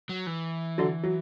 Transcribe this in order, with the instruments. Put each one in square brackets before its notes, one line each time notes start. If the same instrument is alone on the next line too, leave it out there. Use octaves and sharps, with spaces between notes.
[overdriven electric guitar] F#3
E3
[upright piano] D3 F#3
F#3